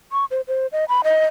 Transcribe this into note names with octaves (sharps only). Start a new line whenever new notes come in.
C#6
C5
C5
D#5
B5
D#5